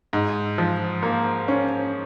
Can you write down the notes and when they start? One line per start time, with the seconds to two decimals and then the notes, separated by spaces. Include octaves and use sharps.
0.13 G#2
0.58 F3
1.03 A#3
1.48 C#4